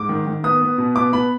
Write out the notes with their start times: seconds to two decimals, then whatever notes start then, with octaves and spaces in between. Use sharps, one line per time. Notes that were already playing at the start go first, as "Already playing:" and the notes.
Already playing: G#2 D6
0.09 D#3
0.27 D#3
0.44 B3 D#6
0.61 B3
0.78 B2
0.95 B3 D6
1.13 B3 B5